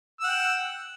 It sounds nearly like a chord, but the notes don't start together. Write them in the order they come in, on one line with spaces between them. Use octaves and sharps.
E6 F#5 G5